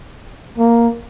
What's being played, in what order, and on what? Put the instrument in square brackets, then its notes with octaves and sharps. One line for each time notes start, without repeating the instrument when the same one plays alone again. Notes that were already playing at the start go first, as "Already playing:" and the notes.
[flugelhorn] A#3